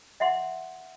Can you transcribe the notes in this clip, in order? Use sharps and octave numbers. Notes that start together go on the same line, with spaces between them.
D#5 E5 F#5 C6